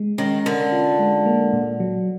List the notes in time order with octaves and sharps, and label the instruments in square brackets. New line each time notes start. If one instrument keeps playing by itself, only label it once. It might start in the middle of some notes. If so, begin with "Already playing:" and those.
Already playing: [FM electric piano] G#3
[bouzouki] D#3 [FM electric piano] C#4
[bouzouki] D3 [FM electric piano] A#4
[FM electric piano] F4
G#3
A#3
A#2
F#3